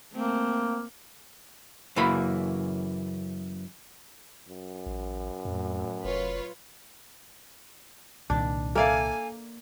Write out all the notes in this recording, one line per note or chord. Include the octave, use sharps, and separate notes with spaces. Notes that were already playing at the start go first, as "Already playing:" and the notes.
A3 A#3 C4
F#2 C#3 E3 A#3 B5
F#2
A1
F2 A2 F#3
F1 F4 B4 C#5
C2 A#2 D#3 D4
A#3 A4 D5 E5 F5 G#5